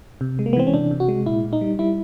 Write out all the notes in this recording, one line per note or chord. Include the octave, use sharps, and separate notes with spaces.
C3
G#3
A#3
B3
E3 C4
C#4
C3 D4
C3
F#4
G#3
A#2 E4
A#2
D#4
G3
G3 E4